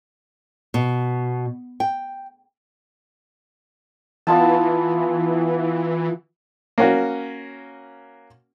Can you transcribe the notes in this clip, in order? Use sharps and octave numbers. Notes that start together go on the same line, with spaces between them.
B2
G5
E3 B3 F4 A5
A#3 C#4 F#4